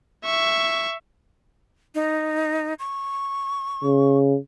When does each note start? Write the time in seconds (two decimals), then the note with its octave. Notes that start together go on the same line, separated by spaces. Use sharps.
0.25 E5 C#6
1.95 D#4
2.79 C#6
3.84 C#3